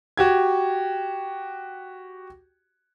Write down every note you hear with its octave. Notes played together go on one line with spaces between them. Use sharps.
F#4 G4 G#6